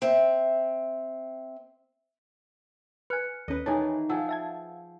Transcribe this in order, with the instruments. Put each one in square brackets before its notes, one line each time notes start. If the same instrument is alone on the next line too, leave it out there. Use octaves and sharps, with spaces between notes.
[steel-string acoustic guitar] C4 E5
[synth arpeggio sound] B4 G#5 [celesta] F6 F#6 C#7
[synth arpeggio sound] D#2 C#4 [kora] B4 D#5
[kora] D#3 E3 G#4 [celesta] C#5 [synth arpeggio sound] A5
[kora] F3 G#4 [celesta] F5 F#5 E6
[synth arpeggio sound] E5 A5 G#6